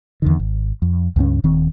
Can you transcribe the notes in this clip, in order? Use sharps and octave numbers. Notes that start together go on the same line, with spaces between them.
E2 D3 D#3
G#1
F2
C#2 G2 A3 C#4
D#1 D#3 C4